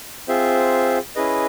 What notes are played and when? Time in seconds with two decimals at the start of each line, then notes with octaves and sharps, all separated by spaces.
0.28 C4 F4 G#4 C5 E5
1.16 C#4 E4 G#4 B4 D#5